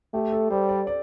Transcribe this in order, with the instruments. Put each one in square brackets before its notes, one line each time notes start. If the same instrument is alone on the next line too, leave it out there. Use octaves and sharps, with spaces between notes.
[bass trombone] A3 [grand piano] G4
[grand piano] A4
[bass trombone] G3 [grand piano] C5
[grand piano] D5
D5